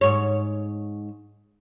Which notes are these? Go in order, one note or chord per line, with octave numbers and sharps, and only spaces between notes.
G#2 C#5